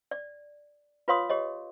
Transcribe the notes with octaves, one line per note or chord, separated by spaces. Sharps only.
D5
F4 B4 C#5 F5 C6 D#6
G4 C#5 D#5